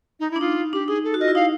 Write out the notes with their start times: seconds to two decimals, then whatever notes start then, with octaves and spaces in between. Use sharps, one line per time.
0.20 D#4
0.31 D4 E4
0.40 D#4 F4
0.73 D4 G4
0.88 D#4 G#4
1.04 A4
1.14 F#4
1.20 F4 D#5
1.28 E4
1.35 D#4 F5